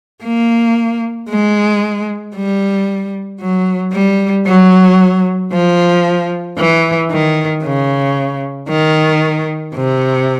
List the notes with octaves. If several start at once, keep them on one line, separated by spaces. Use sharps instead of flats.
A#3
G#3
G3
F#3
G3
F#3
F3
E3
D#3
C#3
D#3
C3